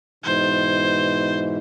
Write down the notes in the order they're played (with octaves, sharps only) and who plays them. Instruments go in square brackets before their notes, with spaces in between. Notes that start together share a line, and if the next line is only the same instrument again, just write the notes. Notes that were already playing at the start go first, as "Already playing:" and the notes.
[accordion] G#2 B2 E3 [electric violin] C5